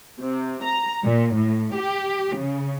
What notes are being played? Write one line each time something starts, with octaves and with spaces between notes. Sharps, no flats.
C3
A#5
A#2
A2
G4
C#3